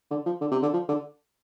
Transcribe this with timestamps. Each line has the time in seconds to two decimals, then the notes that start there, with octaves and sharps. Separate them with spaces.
0.11 D3
0.26 F3
0.41 D3
0.51 C3
0.62 D3
0.73 F3
0.89 D3